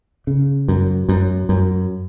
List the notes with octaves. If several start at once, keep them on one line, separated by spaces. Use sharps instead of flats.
C#3
F#2
F#2
F#2